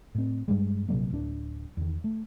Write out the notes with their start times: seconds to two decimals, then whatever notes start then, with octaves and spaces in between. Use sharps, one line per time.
0.15 A2 C4
0.48 G2 G3 G#3
0.88 A#1 C3 F#3 A#3
1.11 D1 D4
1.77 E2 D#3
2.04 A3